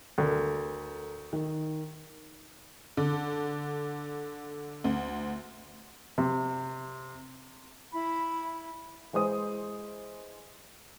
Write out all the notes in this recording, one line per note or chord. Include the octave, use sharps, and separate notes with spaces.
D2 A4 A#4
D#3
D3
D2
C3
E4 B5
E3 G#3 C5 D#6